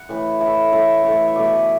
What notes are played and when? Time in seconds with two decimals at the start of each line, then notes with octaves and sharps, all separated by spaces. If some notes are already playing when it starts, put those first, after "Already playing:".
Already playing: F#5
0.09 A2 E3 A3
0.40 A2 E3 A3
0.72 A2 E3 A3 E5
1.03 A2 E3 A3 C#5
1.27 E5
1.35 B2 A3 D5